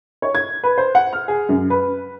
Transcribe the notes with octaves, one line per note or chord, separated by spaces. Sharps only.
C#5
G#6
B4
C5
F#5
F6
G#4
F#2
B4